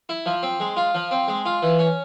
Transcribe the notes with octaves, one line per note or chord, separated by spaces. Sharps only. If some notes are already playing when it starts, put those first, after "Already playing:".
E4
F3
C4
G#3
F4
F3
C4
G#3
F4
E3
C#4